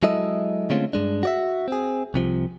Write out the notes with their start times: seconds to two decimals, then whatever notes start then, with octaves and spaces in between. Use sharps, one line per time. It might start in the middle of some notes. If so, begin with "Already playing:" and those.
0.03 F#3 G#3 E4 A4 D#5 E5
0.70 D3 G#3 A3 C4 C#4 F4
0.93 G2 G#3 D4
1.23 F#4 D5 E5
1.68 C4 G#4
2.14 C2 C3 F3